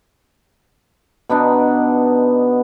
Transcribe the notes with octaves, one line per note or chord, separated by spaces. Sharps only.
B2 B3 D4 D#4